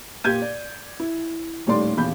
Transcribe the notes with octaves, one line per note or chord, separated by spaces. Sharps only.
A#2 G4 G6 G#6 D#7
D5
E4
D#1 A2 D#3 G3 D5 C6
D#1 E2 B5 G6